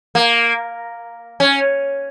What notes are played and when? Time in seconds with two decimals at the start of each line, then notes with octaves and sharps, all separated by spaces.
0.15 A#3
1.40 C#4